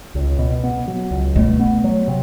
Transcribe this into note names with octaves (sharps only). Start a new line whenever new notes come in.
C#2
B2
B3
F#3
C#2
B2 A3
B3
F#3
C3